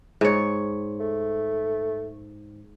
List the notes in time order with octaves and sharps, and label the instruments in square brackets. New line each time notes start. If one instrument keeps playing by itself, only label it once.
[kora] G#2 C#5
[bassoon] A3